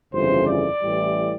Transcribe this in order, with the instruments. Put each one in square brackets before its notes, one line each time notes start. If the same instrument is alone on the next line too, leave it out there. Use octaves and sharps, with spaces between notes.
[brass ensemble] G1 F2 C#3 E3 C5
D5
A1 A2 E3 G3